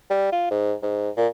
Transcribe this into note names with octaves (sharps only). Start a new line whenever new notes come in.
G3
F4
G#2
G#2
A#2